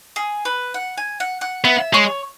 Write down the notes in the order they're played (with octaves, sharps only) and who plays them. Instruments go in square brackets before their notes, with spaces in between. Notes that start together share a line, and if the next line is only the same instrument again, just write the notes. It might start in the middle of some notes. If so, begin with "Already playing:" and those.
[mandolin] G#4
B4
F#5
G#5
F#5
F#5
[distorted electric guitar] B3 [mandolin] E5
[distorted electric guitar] G#3 [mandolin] C#5